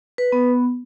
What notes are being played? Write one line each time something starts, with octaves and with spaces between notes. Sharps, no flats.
B4
B3